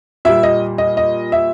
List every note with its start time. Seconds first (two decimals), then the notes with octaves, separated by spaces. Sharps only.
0.25 A#2 G3 E5
0.43 D#5
0.78 D#5
0.97 D#5
1.32 E5